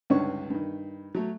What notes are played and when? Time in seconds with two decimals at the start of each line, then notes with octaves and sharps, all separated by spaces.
0.10 C#2 G2 D3 D#4 C#5 C#6
0.50 G2 D#3
1.15 F#3 A3